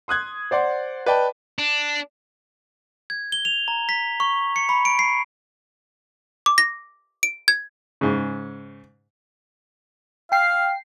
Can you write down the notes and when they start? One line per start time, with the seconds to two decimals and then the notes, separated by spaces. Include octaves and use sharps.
0.08 C6 D#6 F#6 G#6
0.51 C5 D5 F#5 C6
1.06 B4 D5 D#5 G5 A5
1.59 D4
3.10 G#6
3.32 G7
3.45 F7
3.68 A#5
3.89 B6
4.20 C#6
4.56 C#7
4.69 B5
4.85 D7
4.99 C7
6.46 D6
6.58 A#6
7.23 D7
7.48 G#6
8.01 G#2 C#3
10.32 F5 G5 C7